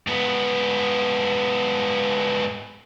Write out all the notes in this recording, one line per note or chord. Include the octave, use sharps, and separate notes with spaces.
G#2 B3